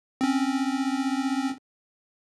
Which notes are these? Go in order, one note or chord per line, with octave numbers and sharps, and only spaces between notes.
C4 C#4